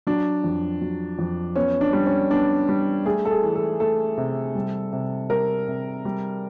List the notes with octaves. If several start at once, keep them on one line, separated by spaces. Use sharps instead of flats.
F#3 D4
F2
F#3
F2
B3 C#4
D4
G3
C#4
B3 D4
G3
A3 G#4
A4
G#4
E3
A4
A3 A4
C3
G3
C3
G3 A#4
C3
G3